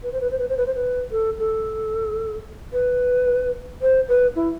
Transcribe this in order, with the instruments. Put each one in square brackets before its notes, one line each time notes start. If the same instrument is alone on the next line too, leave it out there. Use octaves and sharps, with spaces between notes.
[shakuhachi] B4
C5
B4
C5
B4
C5
B4
C5
B4
A4
A4
B4
C5
B4
E4